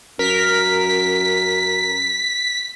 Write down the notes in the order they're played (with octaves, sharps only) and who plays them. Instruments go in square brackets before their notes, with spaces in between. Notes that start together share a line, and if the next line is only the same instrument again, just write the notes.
[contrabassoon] F#2 [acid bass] A#4 [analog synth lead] B6